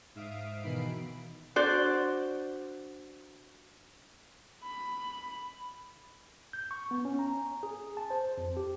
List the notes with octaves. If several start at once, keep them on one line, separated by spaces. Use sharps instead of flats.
G#2 E5 F5 D#6 D7
B2 D#3 E3 B5 C7 D7
D4 F#4 C5 D5
B5
G6
C#6
B3
C#4
A#5
G#4
A5
C5
F2
G4